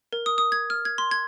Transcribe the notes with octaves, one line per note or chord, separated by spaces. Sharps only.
A#4
D#6
D#6
G#6
F6
G#6
C6
G#6